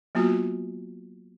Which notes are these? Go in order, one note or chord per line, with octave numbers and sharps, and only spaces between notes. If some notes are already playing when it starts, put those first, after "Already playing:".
F#3 A#3 B3 F4 F#4